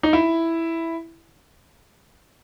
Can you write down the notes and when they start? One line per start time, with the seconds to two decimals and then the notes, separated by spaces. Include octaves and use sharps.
0.03 D#4
0.13 E4